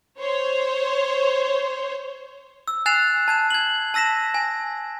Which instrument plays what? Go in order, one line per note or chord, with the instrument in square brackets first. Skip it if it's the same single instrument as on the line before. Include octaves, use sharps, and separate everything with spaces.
[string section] C5 C#5
[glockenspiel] E6
G#5 F#6 A6 C7 E7 F7
A5 G#6 E7
G#6 F#7
A5 E6 A#6 B6 E7
G#5